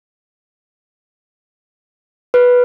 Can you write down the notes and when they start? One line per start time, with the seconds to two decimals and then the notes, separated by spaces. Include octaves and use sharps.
2.34 B4